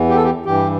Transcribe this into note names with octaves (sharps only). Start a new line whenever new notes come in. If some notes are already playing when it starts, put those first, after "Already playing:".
Already playing: E2 E3
G4
A4
G4
G2 E3 G4